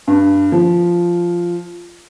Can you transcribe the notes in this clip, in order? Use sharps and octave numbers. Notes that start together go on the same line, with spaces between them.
G2
F3